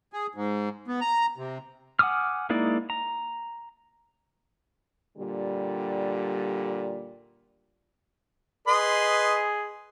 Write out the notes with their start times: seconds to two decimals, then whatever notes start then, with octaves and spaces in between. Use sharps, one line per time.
0.13 G#4
0.35 G#2
0.87 B3
1.01 A#5
1.37 C3
1.99 F#5 G#5 D6 D#6 F6
2.50 G#3 A#3 D#4 E4 D5
2.90 A#5
5.17 A#2 D3 G3
8.67 G#4 B4 D#5 C6